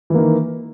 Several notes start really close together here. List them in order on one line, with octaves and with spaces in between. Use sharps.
E3 A#3 D#3